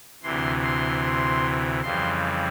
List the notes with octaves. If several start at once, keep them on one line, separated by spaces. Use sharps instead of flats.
D2 C3 E3 C6
C6
F2 C#3 E3 G3 C6